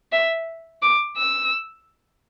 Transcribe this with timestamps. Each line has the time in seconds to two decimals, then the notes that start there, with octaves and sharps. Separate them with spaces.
0.12 E5
0.82 D6
1.17 E6